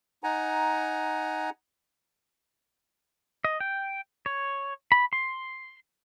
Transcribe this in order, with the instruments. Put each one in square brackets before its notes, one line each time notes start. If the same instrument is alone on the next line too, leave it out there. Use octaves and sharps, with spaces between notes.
[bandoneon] D#4 F#5 G#5 A#5
[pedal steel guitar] D#5
G5
C#5
B5
C6